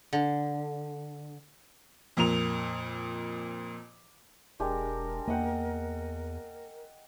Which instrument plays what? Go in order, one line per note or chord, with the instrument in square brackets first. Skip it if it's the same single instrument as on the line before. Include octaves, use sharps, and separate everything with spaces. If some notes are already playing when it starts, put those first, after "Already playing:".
[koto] D3
[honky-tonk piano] F2 A#2 A#4 F7
[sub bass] E1 [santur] G#3 D4 G4 [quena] A#4
[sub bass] E2 [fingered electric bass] A#3 [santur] D#5 F#5 G5